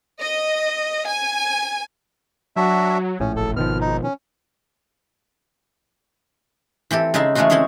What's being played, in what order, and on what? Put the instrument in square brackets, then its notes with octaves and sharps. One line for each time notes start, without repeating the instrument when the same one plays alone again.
[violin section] D#5
G#5
[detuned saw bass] F#3 [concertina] D4 F#4 E5
[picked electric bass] A#1 A2 [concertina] C#4
[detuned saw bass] F#1 [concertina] A4
[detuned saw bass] G#1 [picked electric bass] B2 D#3 F3 [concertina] F6
[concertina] D#4
C#4
[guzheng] E3 C4 G4 A4
C#3 G#3 D#4 E5 A5 C6
E3 G#3 A3 C#4 F4 F#4
C4 C#4 E4 G#4 C#5